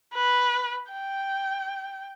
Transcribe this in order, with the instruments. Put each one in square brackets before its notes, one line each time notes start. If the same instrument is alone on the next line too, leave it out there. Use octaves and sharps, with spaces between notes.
[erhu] B4
G5